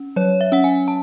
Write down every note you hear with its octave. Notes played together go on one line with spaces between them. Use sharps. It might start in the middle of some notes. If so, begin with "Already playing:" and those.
Already playing: C#4
F#3 C#5
E5
C#4 F#5
G#5
A5